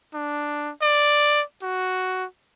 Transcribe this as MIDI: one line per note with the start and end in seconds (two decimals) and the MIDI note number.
0.14 0.71 62
0.82 1.43 74
1.62 2.25 66